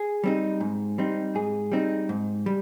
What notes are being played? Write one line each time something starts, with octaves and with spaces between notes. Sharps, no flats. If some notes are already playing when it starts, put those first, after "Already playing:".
Already playing: G#4
G3 C4 D#4
G#2
G3 C4 D#4
G#2 G#4
G3 C4 D#4
G#2
G3